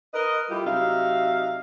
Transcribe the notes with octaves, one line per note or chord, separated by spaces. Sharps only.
A#4 B4 D#5
G3 A3 E4 F4 G4
C3 F#3 D#4 E5 F5